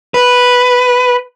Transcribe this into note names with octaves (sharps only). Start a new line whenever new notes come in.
B4